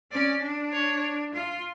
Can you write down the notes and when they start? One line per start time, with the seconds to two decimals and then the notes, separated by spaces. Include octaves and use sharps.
0.12 C#4 D5
0.42 D4
0.72 C#5
1.34 F4